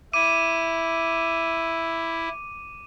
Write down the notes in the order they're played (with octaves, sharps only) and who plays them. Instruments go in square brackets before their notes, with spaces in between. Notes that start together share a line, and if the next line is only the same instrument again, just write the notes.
[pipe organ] E4 [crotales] D6 D#7